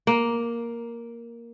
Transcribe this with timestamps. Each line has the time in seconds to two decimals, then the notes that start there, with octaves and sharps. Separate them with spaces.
0.07 A#3